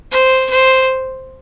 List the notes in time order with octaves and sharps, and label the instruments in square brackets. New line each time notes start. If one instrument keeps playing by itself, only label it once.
[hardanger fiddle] C5
C5